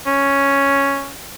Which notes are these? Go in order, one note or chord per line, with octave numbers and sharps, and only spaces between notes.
C#4